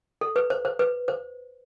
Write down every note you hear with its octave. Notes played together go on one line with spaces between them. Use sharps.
A4
B4
C5
C5
B4
C5